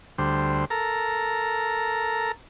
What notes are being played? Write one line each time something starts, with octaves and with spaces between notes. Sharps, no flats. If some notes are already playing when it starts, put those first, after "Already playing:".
D2 G3 C5
A4 A#4 A#5